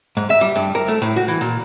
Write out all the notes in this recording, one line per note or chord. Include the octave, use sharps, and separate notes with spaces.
G#2
E5
G3
G2
A#4
A3
A2
F#4
E3
A#2